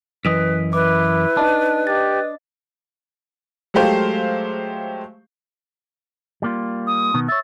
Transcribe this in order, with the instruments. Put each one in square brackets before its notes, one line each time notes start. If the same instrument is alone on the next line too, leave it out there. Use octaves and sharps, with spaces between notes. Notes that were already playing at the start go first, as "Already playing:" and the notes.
[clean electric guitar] F#2 E3 D#5 [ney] B4 [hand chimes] B6
[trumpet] E4 [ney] B4 [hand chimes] D6
[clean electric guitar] D4 [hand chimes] D#4 D#5 A5
[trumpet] G4 [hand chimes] D#5 A6
[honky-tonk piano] F#3 G#3 A3 G4 C5 F5
[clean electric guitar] G3 A#3 F4
[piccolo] D#6
[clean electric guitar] B2 D#3 B3
[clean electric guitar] C#5 E5 [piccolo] A6